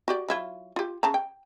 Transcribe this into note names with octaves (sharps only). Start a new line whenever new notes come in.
F#4 G4 D5
F#3 E4 F4
F4 G4
C#3 A5 A#5
G5